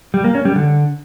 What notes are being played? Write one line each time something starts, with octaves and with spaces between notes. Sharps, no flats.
G3
A#3
C#4
G3
D3